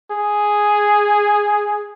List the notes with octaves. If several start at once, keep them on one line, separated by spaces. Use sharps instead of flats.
G#4